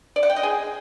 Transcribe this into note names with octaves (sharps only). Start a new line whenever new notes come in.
D5
F#5
G5
D#5
G#4